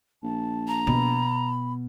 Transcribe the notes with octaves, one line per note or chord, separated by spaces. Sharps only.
A#1 A5
A#5
B2 B5